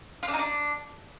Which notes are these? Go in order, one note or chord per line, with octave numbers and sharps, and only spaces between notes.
F4
D4
D#4
D4